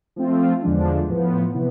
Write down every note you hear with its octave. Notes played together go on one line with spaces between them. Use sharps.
F3 A3 C4 F4
E2 D3 F3 G#3 D4
A2 F3 B3
C3 E3 B3